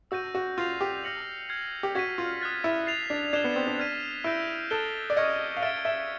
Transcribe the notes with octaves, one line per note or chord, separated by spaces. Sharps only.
F#4 E6 G6 A#6 D#7
F#4
F4 G6 C7 F7
G4
F6 A#6 C#7 F#7
F6 G#6 C7
G4
F#4 G#6 B6 D#7
F4
D#6 F#6 A6
E4
A6 C7 F7
D4
D4 G#6 C7 E7 G7
B3
C4
D4
F6 G#6 B6 D#7
E4 E6 G6 A#6 D7 G7
A4 D#6 F#6 A6 D7 G7
D5
D#5 C#6 F6 G#6 C#7
F5
E5 C#6 F6 A6 D7 G7
E5